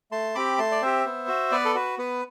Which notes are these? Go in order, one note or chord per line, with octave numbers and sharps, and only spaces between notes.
A3 A5 C6
C4 G4 B5 D6
A3 A5 C6
D5
C4 G4 C5 E5
B3
F#4
B3 B4 D5
A4
F#4 B4
B3 B4